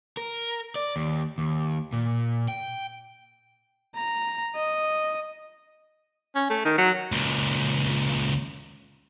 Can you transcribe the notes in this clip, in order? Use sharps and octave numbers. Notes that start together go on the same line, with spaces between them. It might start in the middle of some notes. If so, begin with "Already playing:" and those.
A#4
D5
D#2
D#2
A#2
G5
A#5
D#5
C#4
A3
D#3
F#3
C#2 A#2